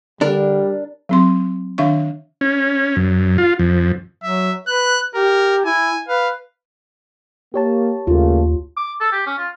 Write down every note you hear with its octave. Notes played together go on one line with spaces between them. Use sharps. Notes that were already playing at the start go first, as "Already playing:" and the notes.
D3 G3 D4 A#4
F#3 C4 C6
D#3 D4 E5 F5 C#6
C#4
F#2
F4
F2
F#3 E5
B4 F#6
G4 A#4
E4 G#5
B4 F5
A#3 G4 C#5 A5
D#2 C#3 A3 A#3 F4
D6
A4
G4
C#4
F4